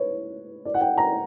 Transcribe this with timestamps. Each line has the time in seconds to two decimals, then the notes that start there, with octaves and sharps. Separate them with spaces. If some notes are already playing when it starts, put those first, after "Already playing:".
Already playing: B4 C#5
0.65 D5
0.74 F#5
0.81 G5
0.98 A#5